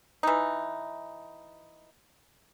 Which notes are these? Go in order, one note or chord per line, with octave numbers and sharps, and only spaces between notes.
E3 D#4